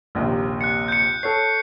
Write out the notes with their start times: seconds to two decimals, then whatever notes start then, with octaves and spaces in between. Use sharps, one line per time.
0.15 A#1 D#2 C3
0.61 F#6 C#7
0.88 G6 C#7
1.23 A4 C#5 C7